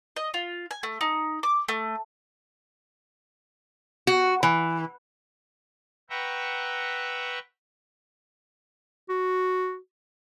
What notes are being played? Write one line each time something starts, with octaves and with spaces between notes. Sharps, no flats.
D#5
F4
G#5
A3
D#4
D6
A3
F#4
E3
B4 E5 F#5 G5 A#5 C#6
F#4